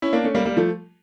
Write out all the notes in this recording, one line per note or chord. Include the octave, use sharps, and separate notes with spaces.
C#4 E4
A#3 D4
A3 C#4
G3 A#3
G3 A#3
F3 A3